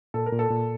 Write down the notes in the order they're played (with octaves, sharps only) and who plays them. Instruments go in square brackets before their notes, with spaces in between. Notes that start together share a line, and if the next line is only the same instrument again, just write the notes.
[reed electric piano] A#2 [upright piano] A4
[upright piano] A#4
[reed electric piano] A#2
[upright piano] A4
[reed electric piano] A#2